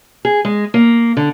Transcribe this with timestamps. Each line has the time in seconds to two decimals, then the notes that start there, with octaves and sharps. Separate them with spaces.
0.25 G#4
0.45 G#3
0.74 A#3
1.17 D3